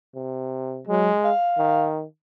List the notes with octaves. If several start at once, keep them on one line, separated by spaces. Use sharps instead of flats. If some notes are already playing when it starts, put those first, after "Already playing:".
C3
F#3 G#3
F5
D#3